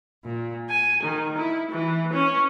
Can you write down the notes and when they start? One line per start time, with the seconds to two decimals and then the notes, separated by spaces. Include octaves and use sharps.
0.23 A#2
0.68 G#5
1.02 D#3
1.37 E4
1.71 E3
2.12 C#4